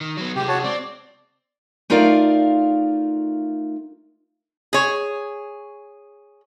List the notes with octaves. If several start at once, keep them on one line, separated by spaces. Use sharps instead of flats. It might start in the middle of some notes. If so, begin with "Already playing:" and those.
D#3
F#3 B3
C3 G#3 G4
F#4 C#5 A5
C4 D5
A3 D#4 F4 A#4 D5 F5
G#4 C#5